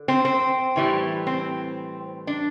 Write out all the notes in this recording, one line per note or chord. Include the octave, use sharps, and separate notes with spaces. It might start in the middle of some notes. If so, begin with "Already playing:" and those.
Already playing: D3
C4
C4
A2 E3 G3
C4
D4